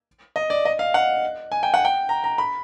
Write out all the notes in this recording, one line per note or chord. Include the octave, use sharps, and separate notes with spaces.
D#5
D5
D#5
F5
F#5
G#5
G5
F#5
G5
A#5
A#5
B5